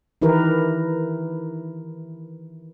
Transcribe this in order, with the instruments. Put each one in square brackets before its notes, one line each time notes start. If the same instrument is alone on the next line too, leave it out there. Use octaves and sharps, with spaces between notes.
[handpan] D#3 E3 E4 G4 A#4 B4